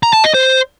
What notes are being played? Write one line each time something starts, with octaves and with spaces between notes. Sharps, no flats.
A#5
A5
D#5
C5